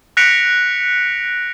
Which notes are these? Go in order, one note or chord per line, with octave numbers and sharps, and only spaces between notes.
F#6 A#6 B6 C#7 D7 F7